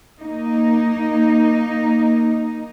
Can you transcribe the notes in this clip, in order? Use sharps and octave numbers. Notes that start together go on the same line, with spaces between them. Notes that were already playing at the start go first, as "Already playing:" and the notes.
A#3 D#4